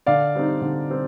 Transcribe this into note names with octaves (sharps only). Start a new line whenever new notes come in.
D3 D5 F5
G3 C4 D#4
D3
G3 C4